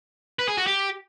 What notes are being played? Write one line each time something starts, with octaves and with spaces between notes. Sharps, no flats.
B4
G#4
F#4
G4